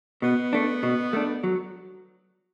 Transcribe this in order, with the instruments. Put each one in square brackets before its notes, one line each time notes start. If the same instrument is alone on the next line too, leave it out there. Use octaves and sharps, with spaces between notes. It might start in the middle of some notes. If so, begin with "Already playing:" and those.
[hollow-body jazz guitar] B2 [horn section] B3
[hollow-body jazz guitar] A3 D4
B2
A3 D4
F#3